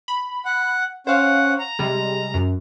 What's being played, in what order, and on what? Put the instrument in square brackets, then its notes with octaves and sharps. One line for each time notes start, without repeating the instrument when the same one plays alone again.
[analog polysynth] B5
[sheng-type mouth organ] F#5
[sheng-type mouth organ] C#4 F#5 [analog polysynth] C5 F5
[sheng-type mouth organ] A#5
[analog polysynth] C3 G3 G#3
F#2